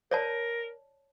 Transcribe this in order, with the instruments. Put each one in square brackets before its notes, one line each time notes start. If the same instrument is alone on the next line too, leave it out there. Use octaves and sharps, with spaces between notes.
[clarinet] A#4 [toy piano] C#5 D5 A5